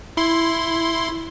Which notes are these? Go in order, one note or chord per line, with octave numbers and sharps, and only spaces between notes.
E4 C6